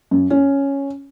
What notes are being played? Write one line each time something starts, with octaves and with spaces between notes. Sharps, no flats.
F#2
C#4